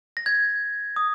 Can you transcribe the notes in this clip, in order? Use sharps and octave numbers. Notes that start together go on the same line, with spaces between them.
A#6
G#6
D#6